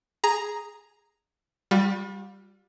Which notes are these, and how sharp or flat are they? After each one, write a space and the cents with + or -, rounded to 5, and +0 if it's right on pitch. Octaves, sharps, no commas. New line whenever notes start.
G#4 +0 A#5 +0
G3 +0 F4 +45